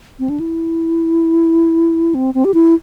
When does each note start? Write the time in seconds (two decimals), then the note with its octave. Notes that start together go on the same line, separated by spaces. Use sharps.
0.19 C4
0.29 D4
0.40 E4
2.15 C4
2.34 C4
2.45 G4
2.54 E4